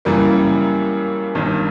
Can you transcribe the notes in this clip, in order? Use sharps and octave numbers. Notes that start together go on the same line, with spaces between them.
F#2 C#3 E3 G3 A#3
G1 G2 D#3